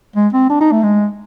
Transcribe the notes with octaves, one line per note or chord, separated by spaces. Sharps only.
G#3
C4
D4
D#4
A3
G#3